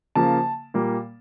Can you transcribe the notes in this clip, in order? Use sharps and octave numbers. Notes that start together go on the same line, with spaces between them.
C#3 F3 A#3 A5
A#2 G3 A#3